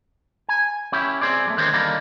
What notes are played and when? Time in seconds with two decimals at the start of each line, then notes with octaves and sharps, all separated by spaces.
0.49 G#5
0.92 C#4 E4 G4
1.21 C4 G#4 C5 D5
1.46 B1 G3 A3
1.57 D3 D#3 G#3 C4 C5 C#5
1.73 D3 D#3 G3 A#3 D4 D#4